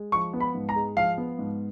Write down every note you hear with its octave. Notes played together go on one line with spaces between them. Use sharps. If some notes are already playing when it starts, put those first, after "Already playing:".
Already playing: G#3
F3 C#6
B3
B5
G#2
A#5
G#3
F3 F5
B3
G#2